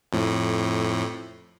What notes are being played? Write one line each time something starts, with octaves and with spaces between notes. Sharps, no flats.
F2 A2